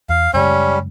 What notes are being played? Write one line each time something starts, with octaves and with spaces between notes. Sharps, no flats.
E2 F5
F#2 C#3 G3 G#3 C#4